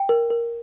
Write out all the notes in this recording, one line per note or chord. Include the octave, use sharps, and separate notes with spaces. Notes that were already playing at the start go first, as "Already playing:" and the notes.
Already playing: G5
A#4
A#4